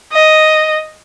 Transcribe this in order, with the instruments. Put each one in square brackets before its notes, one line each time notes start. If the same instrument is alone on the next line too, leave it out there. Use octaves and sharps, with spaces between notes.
[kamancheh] D#5